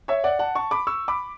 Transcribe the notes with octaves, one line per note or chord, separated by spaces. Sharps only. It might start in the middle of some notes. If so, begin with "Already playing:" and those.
C#5 E5
D5 F#5
F#5 A5
A5 C#6
B5 D6
C#6 E6
B5 D6